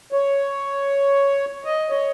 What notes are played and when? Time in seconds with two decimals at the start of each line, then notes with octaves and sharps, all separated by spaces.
0.13 C#5
1.65 D#5
1.90 C#5